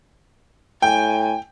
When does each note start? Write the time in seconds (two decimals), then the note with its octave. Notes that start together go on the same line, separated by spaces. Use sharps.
0.82 A2 G5 G#5